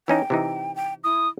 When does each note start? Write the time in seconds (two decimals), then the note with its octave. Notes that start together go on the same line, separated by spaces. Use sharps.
0.08 E3 C#4 D#4 G5
0.30 C3 E3 D#4
0.76 G5
1.04 E4 D#6